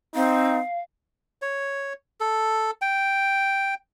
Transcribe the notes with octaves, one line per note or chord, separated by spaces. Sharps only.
C4 D#4 F5
C#5
A4
G5